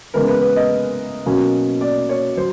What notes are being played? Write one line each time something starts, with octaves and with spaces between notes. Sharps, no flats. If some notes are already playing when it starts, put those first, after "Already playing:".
C#3 E3 G#3 B3 A#4
B4
B4
D#5
B2 F#3 A#3 C#4
D5
C#5
F#3 C5